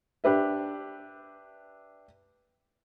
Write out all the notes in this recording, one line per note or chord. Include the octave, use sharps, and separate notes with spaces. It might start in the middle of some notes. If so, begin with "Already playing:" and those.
D4 G4 B4 E5